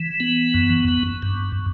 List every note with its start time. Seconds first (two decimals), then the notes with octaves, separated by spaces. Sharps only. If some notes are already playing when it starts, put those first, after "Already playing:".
Already playing: E3
0.20 B3
0.54 F#2
0.88 F#2
1.22 G2